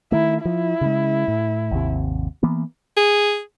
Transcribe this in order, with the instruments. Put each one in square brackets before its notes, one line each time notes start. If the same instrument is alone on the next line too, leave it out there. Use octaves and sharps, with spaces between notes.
[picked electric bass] D#3 A3 [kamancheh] E4
[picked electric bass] F3 [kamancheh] E4
[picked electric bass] C#3 G#3
A2
G#1 D#2 C3
E3 A#3 B3
[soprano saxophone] G#4